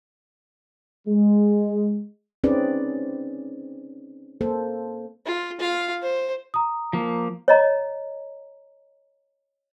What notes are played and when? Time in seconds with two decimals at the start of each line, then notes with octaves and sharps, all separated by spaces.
1.06 G#3
2.44 C4 C#4 D#4 G#4 B4 D5
4.41 A#3 A4 C5
5.26 F4
5.60 F4 F5
6.02 C5
6.54 A#5 D#6
6.93 F3 A#3
7.48 C#5 D#5 A#5